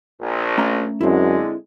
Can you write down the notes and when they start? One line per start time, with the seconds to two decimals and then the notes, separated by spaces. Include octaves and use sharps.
0.20 A#1
0.58 A3 C#4 A#5
1.01 F#2 D3 G#3 C4 E4